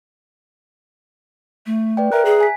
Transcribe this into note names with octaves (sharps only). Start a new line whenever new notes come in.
A3
B4 D5 G5
A#4 E5 A#5 F#6
G#4
G#5 B6